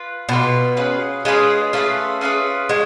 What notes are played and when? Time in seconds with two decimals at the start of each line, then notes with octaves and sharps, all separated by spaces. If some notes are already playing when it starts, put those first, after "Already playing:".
Already playing: F4 B4
0.29 B2 B3 F4 B4
0.77 C#4 F4 G#4 B4
1.25 G#3 C#4 F4 G#4 B4
1.73 A3 C#4 F4 G#4 B4
2.21 C#4 F4 G#4 B4
2.69 G#3 F#4